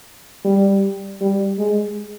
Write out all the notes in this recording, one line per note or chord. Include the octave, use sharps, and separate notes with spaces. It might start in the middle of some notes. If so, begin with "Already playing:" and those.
G3
G3
G#3